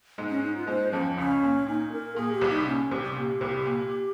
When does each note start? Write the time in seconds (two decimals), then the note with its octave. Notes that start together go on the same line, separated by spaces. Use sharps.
0.18 G#2 G#3
0.30 C#4
0.43 D#4
0.56 F4
0.67 G#2 G#3 C5
0.92 F2 F3 C#4
1.18 C#2 C#3 C#4
1.43 A#2
1.66 A#2 D#4
1.92 A#4
2.16 A#2 G#4
2.33 G4
2.41 C2 C3
2.50 D#4
2.67 A#2 C#4
2.91 C2 C3
3.16 A#2 G4
3.41 C2 C3
3.66 A#2